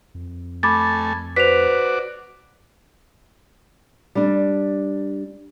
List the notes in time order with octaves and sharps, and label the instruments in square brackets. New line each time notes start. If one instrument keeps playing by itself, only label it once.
[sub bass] F2
[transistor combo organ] A3 G#5 [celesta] B5 D6 A6
[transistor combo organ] F#4 D5 [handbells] B4 C5 [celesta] B6 F7
[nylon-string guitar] G3 D4